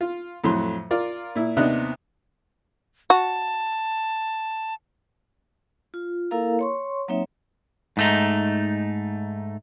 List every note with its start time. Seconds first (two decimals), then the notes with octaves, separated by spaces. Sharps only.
0.01 F4
0.44 F2 A2 F#3 C6
0.91 F4 A#4 D5
1.36 A#2 E4
1.57 D#2 C3 B3 D4 D#4 F#6
3.10 F#4 A5
5.94 F4
6.31 A#3 E4 A4 A#4 F5 A#5
6.59 C#5 C6 C#6
7.08 F#3 A#3 C4 D#4 C#5 E5
7.97 G#2 A3 D#4